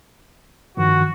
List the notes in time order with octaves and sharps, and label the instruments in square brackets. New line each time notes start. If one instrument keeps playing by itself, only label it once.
[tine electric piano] G2 D#3 F3 [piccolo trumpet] F#4